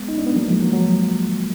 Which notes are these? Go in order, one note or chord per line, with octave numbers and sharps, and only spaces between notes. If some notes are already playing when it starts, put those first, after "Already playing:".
Already playing: G#3 B3
D#4
D4
B3
F#3 A#3
F3 G#3
F#3
F#3